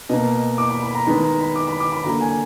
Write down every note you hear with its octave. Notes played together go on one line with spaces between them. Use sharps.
B2 A#3 D#5
D6
B5
B5
A#5
D#3 G#3 B3 B5
A#5
B5
D6
B5
D6
B5
D3 F#3 A#3 A#5
G#5